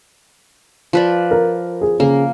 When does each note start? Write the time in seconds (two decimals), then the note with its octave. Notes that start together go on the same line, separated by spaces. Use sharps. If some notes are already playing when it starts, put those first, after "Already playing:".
0.93 F3 B4 D5
1.31 A#4
1.81 G#4
2.00 C#3 A#3